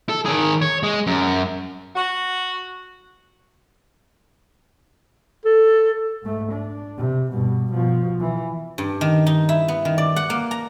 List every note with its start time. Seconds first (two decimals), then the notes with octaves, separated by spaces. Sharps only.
0.09 A4
0.26 D#3 G#4
0.62 C#5
0.83 G#3
1.07 F#2
1.96 F#4
5.45 A4
6.23 G#2 A3
6.52 D4
6.97 C3
7.31 G2 B2
7.73 B2 F3
8.20 E3
8.78 G2
9.01 D#3
9.26 D#4
9.49 E4
9.68 B3
9.85 D#3
9.98 D5
10.16 F#5
10.30 A#3
10.51 A#5